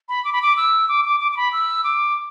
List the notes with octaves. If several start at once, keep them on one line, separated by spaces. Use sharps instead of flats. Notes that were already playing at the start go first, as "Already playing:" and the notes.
B5
D6
B5
D6
E6
D6
D6
D6
D6
B5
E6
D6